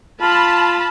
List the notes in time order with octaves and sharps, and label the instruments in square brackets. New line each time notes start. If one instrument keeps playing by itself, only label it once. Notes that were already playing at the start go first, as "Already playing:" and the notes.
[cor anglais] F4 [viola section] A5 B5